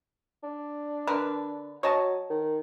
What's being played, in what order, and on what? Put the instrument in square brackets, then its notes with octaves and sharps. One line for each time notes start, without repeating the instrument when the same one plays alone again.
[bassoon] D4
[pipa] D3 A#4 B4
[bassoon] F#3 [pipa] C#5 D#5 A5
[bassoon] D#3